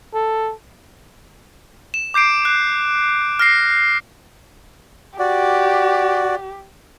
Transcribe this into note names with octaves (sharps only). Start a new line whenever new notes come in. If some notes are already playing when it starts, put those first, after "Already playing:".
A4
E7
D6 G6 C7 D7
F#6
F6 A#6 C7
F#4 G4 D5